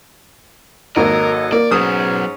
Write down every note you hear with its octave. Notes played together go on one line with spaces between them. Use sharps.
G#1 F#3 A#3 A4 A#4 D#5
A#3 D5
G#2 F#3 B3 C#4 D#6